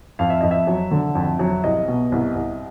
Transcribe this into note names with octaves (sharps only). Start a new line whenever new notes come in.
F2 F5
E5
F2 D#5
E5
F#3
D3
F2
F#3
C2 D#5
B2
C2
C2